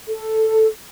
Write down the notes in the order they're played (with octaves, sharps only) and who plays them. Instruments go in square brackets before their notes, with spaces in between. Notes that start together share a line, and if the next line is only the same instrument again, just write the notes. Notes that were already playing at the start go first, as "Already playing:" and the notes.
[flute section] A4